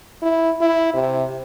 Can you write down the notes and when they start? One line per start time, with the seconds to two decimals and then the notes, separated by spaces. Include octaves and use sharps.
0.23 E4
0.61 E4
0.94 C3